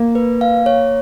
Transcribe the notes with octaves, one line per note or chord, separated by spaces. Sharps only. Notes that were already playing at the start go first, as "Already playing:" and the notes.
Already playing: A#3
B4
F5
C#5